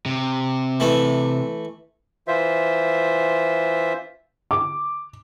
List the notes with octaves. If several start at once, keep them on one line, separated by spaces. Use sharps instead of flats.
C3
E3 A3
E3 F4 C5 E5
D6